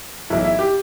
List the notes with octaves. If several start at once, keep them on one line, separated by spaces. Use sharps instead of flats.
B1 A2 E3 E4
E4
G4